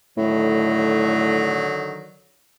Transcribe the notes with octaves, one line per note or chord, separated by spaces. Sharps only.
A2 D3 D#3 F#3